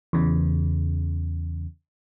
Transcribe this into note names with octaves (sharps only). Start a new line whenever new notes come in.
E2 C#3